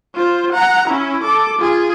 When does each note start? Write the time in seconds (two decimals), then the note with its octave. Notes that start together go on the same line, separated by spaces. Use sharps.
0.15 F4 C5
0.52 F#5 A#5
0.88 C#4 E4
1.24 A4 D6
1.59 F4 G#4